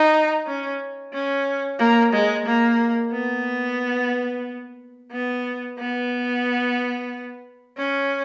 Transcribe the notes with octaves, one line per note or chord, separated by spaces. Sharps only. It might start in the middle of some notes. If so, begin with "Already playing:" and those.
Already playing: D#4
C#4
C#4
A#3
G#3
A#3
B3
B3
B3
C#4